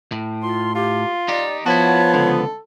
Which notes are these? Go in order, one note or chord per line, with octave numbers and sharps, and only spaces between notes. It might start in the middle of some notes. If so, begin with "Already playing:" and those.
A2
F4 C6
F4 G4
D#4 G4 D5
F3 B3 E4 F#4 C#5 A5
C#2 D3 A4